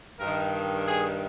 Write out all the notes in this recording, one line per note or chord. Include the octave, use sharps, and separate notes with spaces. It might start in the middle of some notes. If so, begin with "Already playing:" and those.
G2 D#3 A#4
G#4